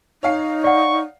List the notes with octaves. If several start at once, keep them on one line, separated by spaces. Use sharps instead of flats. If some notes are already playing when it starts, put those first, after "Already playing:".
D#4 C#5 F5 C7
D5 F#5 C#6